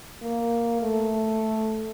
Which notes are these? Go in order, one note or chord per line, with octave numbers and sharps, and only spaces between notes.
A#3
A3